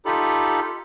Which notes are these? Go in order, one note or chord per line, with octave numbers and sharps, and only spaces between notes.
D#4 F4 G4 A4 B5